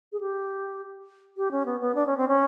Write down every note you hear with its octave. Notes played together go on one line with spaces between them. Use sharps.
G#4
G4
G4
C#4
B3
B3
D4
C#4
C4
C#4